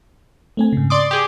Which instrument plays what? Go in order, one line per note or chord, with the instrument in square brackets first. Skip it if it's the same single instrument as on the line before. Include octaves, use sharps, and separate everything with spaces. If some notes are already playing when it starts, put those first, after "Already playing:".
[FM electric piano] A3 C4 G#5
G#2 C#3
[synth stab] D5 C6 D6 [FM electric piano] D#6
[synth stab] G4 G#4